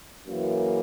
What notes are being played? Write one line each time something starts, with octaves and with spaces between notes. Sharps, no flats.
F#2 C#3 E3 A#3